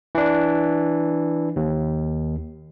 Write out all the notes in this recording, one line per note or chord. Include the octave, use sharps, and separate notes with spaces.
E3 D4
D#2